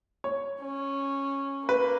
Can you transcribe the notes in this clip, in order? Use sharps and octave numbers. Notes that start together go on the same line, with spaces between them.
C#5
C#4
A#3 B4